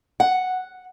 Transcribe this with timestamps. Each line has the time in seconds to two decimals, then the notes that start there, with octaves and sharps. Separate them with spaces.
0.20 F#5